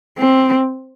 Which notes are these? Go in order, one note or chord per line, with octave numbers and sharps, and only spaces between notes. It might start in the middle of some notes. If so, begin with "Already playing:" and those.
C4